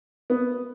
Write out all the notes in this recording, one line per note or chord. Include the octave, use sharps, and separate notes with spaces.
B3